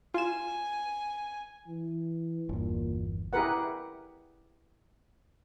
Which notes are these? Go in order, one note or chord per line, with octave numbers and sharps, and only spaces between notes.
F4 G#5 E7
E3
G1 E2 A#2
E4 G4 G#4 A#4 B4 F#5